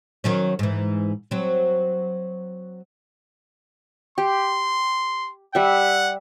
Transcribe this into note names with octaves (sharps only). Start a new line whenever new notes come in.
D#3 F#3 C#4
G#2 E3
F#3 C4
G4 C6
G3 E5 F#5